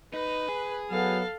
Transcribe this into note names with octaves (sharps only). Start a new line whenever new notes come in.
D#4 B4
G#4
F#3 B3 A4 F5